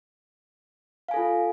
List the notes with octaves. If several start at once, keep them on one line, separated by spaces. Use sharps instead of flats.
F4 A4 F5 G#5